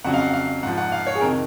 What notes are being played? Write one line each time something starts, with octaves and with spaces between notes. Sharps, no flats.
F2 C#3 F#3 F#5
F5
F#5
F5
G#2 F3 F#5
F#5
F5
C#5
G#4
F2 C3 D#3 A#4